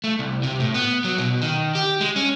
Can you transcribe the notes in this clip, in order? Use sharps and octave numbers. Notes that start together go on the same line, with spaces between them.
A3
C2
C3
A2
B3
F#3
B2
D#3
G4
G#3
C#4